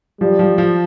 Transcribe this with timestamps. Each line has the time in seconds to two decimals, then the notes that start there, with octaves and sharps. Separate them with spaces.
0.21 F3 G3
0.39 F3
0.58 F3